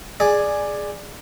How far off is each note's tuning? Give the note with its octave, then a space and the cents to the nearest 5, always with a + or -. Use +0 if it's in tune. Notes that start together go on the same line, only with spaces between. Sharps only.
G#4 +0 D5 +10